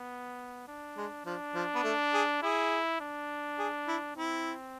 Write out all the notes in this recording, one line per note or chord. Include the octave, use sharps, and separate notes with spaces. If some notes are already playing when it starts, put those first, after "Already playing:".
Already playing: B3
D4
G#3
F3 D4
F3
B3
A3
G#4
E4 G#4
D4
G#4
E4
C4 E4